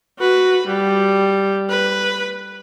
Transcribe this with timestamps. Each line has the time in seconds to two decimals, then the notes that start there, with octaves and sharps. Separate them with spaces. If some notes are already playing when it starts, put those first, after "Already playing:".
0.18 F#4 B4
0.67 G3
1.69 B4